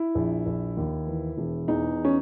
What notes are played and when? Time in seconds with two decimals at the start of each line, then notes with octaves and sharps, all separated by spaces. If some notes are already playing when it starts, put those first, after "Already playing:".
Already playing: E4
0.15 A#1
0.46 A#1
0.77 D#2
1.07 E3
1.37 E1
1.68 E2 D#4
2.05 C#4